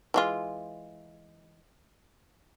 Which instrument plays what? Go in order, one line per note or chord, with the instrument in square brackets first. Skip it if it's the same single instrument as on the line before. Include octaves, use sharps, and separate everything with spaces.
[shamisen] E3 G#3 F4